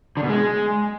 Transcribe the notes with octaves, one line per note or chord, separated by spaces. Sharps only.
D3
B2
G#3